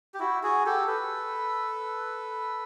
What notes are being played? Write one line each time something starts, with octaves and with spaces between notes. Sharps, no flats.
G4
E4 F#4
F#4 G#4
G4 A4
A4 B4